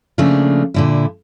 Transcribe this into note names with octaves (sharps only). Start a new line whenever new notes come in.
C#3 F3 A3 A#3 D4
A#2 D3 E4